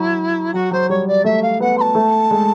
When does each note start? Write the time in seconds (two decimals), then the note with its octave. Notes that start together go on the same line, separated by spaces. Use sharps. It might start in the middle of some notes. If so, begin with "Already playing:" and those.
Already playing: F#3 E4
0.53 F#3 F#4
0.71 F#3 C5
0.89 G3 C#5
1.07 D5
1.24 A3 E5
1.42 F5
1.60 B3 F#5
1.77 C6
1.81 A5
1.95 A3
2.31 G#3